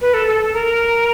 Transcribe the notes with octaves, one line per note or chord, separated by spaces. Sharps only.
B4
A4
A4
A4
A#4